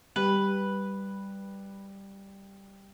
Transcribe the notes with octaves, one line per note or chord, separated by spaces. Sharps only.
G3 B4